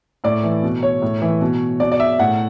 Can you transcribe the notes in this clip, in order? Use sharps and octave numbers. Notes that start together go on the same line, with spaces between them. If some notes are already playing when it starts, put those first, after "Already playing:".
A2 D5
E3
B2
C#5
A2
E3
B2
B2 D5
D5
E5
A2 F#5